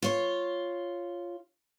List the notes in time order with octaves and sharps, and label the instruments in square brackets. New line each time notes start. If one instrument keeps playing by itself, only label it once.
[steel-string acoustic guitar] F4 C#5